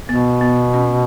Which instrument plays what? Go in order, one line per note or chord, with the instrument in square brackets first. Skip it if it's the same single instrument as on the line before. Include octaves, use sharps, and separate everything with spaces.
[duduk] B2 [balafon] B3
[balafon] B3
C#4